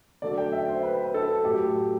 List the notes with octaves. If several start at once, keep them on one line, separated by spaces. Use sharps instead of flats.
D3 F#3 A3 D5
G5
E5
C5
B4
B4
A4
A2 F#3 A3 G4